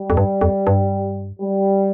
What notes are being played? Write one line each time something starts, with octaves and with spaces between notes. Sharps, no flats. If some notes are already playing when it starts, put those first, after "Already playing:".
Already playing: G3
F2
G2
F2
G2
G3